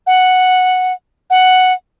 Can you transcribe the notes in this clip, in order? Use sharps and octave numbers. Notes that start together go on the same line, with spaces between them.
F#5
F#5